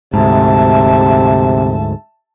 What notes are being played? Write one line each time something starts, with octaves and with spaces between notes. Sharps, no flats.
D2 G#2 C3 E5 A5